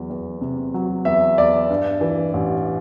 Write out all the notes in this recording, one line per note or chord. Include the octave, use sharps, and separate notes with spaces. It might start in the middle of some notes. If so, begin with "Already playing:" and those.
Already playing: E2 F#3
E2
C3
F#3
E2 E5
E2 D5
G2
E3
A1